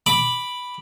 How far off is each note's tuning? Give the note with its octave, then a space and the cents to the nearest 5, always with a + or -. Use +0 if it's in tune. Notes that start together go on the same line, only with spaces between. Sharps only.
B5 +0 D6 +0